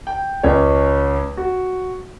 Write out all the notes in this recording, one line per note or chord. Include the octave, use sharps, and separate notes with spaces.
G5
C#2 C#4 C#5
F#4